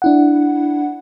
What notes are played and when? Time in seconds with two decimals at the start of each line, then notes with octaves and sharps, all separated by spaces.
0.02 D4 E4 F#5